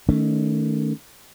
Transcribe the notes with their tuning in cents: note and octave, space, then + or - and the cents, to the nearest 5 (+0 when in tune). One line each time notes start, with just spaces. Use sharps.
D#3 +0 A3 +0 C#4 +25